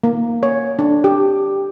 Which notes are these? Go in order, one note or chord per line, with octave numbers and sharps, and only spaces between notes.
A#3
C#5
D4
G4